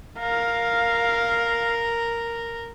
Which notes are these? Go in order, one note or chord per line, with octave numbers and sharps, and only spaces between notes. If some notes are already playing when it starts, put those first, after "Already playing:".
A#4 F5